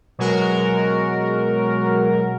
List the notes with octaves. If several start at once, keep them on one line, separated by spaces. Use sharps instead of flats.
B2 F#3 G#3 F#4 A#4